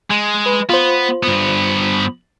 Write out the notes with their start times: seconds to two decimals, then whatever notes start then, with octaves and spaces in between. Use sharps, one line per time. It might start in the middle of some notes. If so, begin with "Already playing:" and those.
0.10 G#3
0.46 B4
0.69 B3 F4 C5
1.23 G2 B3